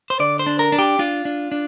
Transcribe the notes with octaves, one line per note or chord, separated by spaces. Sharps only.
C5
D3 D5
C5
D4
A#4
D4
G4
D4 F4
D4
D4